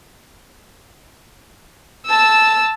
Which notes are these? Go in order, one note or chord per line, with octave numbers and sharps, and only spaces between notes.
A5 E6